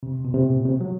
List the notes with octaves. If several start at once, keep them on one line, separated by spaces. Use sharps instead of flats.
C3
B2
C3
A#2
C3
F#3